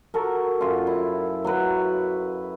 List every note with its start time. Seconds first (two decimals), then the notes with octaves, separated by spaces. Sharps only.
0.14 F#4 A4 A#4
0.61 F#2 F4
0.87 E4
1.44 F#3 F#4 B4